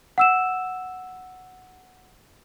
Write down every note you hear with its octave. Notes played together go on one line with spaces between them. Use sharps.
F#5 E6 E7